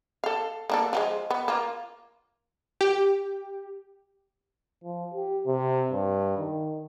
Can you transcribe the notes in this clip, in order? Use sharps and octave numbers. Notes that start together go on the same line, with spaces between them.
A4 F5
A#3 D4 A4
F3 F#3 G#3
B3
A#3 F4
G4
F3
G4
C3
G2
D#3